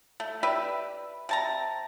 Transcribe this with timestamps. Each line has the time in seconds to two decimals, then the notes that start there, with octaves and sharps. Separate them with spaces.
0.20 A3
0.43 G4 B4 D5 E5
1.29 C3 A5 A#5